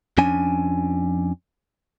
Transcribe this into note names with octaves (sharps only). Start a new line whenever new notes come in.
F2 F3 C#4 D4 G#5